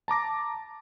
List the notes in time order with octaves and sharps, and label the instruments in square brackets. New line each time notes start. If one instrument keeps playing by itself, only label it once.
[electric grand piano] A5 A#5 D6 A#6